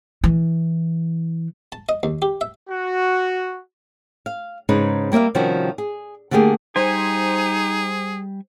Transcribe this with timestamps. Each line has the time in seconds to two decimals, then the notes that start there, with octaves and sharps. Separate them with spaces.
0.24 E3
1.72 A5
1.89 D#5
2.03 D#2
2.22 G4
2.41 E5
2.69 F#4
4.26 F5
4.69 G#2 C#3 D#4 B4
5.12 G3 A#3 D5 E5 F5
5.35 C3 D#3 F3 G3 C#4 F#4
5.78 G#4
6.31 D3 A3 A#3 G4 G#4
6.76 G3 D#4 G#4 C5 G#5